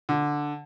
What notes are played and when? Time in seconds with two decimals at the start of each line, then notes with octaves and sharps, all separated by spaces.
0.09 D3